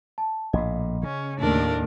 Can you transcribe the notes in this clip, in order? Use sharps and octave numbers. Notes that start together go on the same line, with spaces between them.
A5
A#1 A2 D#5
C#3 C#4
D#2 A2 D4 A#4